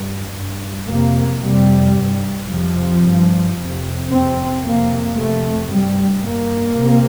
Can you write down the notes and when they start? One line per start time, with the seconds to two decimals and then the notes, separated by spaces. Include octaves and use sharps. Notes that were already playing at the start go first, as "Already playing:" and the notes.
Already playing: G2
0.36 G2
0.89 F2 C3 A#3
1.42 F2 C3 G3
1.96 G2
2.49 F2 C3 F3
3.03 G2
3.56 F2 C3
4.09 F2 C3 C4
4.62 F2 C3 A#3
5.16 F2 C3 A3
5.70 G2 G3
6.23 G2 A#3
6.76 C3